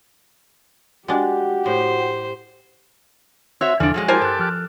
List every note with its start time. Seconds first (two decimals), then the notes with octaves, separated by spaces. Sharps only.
1.08 G#3 D4 F#4 G4 F#5 G5
1.66 A2 C5
3.61 C4 F#4 C#5 E5 E6
3.80 E2 D3 F3 D4 A4 G#5 F6
3.94 F3 F#3 G#3 G#4
4.08 E4 F#4 G4 A#4 C5 G#5 A5 D6
4.22 G2 A4 F#6
4.39 F3 F6 F#6